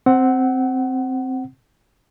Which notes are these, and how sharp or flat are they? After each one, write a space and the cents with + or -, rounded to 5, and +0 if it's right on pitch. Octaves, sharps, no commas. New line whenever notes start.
C4 +0 F#5 +20